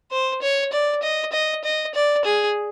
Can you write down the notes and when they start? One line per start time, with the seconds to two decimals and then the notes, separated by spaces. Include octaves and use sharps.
0.11 C5
0.42 C#5
0.73 D5
1.03 D#5
1.33 D#5
1.64 D#5
1.95 D5
2.25 G#4